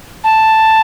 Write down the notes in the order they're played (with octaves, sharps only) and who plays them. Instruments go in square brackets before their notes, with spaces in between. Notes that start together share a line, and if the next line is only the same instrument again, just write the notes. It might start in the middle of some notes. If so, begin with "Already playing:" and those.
[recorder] A5